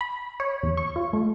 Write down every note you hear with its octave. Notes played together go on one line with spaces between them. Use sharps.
B5
C#5
E2
C#6
F4
A3